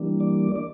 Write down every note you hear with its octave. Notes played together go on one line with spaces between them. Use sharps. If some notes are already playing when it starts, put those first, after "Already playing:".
Already playing: E3 G3 A#3 D4
D5
D5